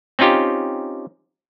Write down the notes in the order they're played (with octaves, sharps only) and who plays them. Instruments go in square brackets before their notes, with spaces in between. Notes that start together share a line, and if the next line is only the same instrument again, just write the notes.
[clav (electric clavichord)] C4 C#4 D#4 F4 G4